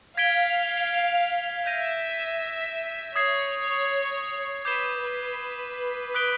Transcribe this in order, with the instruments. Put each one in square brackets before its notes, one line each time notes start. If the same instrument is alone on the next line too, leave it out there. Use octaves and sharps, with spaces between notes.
[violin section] F5 [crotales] G#6 B6 D7 G7
[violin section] E5 [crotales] G6 A#6 D#7
[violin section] C#5 [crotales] D#6 G#6 C7
[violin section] B4 [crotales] D6 G6 C7 E7 G7
[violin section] B4
[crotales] D#6 F#6 B6 D7 G7